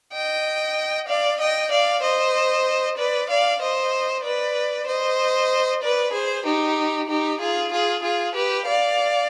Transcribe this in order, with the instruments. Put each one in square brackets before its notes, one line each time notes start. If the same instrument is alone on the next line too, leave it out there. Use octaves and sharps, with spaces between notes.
[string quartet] D#5 G5
D5 F5
D#5 G5
D5 F5
C5 D#5
B4 D5
D5 F5
C5 D#5
B4 D5
C5 D#5
B4 D5
G#4 C5
D#4 G4
D#4 G4
F4 G#4
F4 G#4
F4 G#4
G4 B4
D5 F5